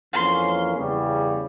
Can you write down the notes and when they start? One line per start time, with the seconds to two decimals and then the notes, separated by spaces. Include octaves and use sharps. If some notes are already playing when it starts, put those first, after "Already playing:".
0.13 F2 E3 A#3 C#4 C6
0.77 E2 C#3 G3